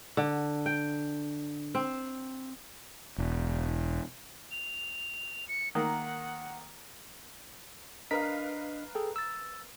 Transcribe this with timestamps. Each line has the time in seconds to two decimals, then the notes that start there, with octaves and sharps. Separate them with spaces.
0.17 D3
0.66 G5
1.75 C4
3.18 E1
4.51 F7
5.48 C#7
5.75 D#3 A#3 F#5
8.11 D4 A#4 B4 D#5 F5 B6
8.95 G#4 A4 G5
9.16 E6 A6